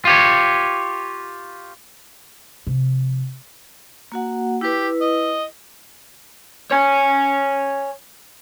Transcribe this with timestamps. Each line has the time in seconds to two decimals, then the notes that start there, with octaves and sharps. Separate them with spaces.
0.05 F4 G4 C#5
2.67 C3 F3
4.12 A#3 F#4 F#5
4.61 E4 G4 B4
5.01 D#5
6.71 C#5 G#5